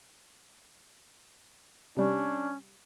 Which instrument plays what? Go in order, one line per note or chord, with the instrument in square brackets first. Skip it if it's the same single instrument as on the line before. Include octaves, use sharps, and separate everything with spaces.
[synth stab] C3 G3 [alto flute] C#4 [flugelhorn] D4